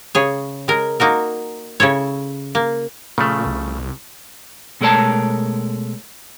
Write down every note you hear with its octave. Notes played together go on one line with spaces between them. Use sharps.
C#3 G#4 C#5
G#3 A#4
A#3 D#4 F#4 A#4
C#3 E4 A4 C#5
A#3
A#2 C#3 F3 A3
C2
B2 G#3 A3 A#4 C#5 A5